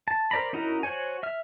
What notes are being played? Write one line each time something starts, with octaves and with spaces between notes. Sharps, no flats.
A5
A#4 C5 D5 A#5 B5
C#4 D#4 E4 F#4 A#4
F#4 C5 C#5 G#5
E5 F6